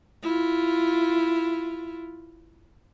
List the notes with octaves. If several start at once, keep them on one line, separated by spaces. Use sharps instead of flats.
E4 F4